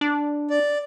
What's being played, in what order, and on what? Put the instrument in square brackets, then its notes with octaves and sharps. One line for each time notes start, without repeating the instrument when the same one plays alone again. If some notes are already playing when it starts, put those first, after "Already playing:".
[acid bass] D4
[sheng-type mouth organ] D5